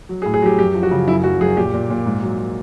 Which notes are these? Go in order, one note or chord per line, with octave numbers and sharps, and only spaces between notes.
F#3
G#4
A2
G#4
F#3 G4
F#2 G4
F3
F#4
C#3
F#2 E4
F#2 F#4
F#2 G#4
A#2 G4
A#2
A#2
G#2
F#3